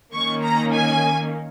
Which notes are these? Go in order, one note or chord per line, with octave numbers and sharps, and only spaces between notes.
D#3 A#3 C#4 C#6
A#5
G#5